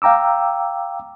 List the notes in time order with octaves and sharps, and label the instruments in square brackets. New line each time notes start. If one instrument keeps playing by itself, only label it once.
[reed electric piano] F5 G5 A#5 D6 E6